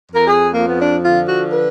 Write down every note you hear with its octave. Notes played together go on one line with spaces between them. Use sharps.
F2 A#4
G#4
F3 A#3
B3
D4
D3 F4
F#4
B4